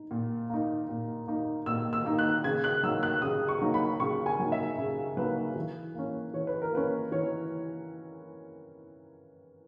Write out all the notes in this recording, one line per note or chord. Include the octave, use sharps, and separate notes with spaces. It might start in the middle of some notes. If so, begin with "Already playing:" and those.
Already playing: D#4
A#2
A#3 D#4
A#2
A#3 D#4
A#2 E6
E6
A#3 D#4
F#6
C#3 G#6
F#6
F#3 A#3 D#4 E6
F#6
C#3 D#6
C#6
F#3 A#3 D#4
B5
C#3 C#6
G#5
F#3 A#3 D#4
E5
C#3
F#3 A#3 D#4 B4
E3
A#3 C#4
E3 C#5
B4
A#4
A#3 C#4 B4
E3 C#5